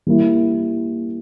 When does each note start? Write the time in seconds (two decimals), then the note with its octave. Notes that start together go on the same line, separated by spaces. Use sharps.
0.07 G3 A#3 E4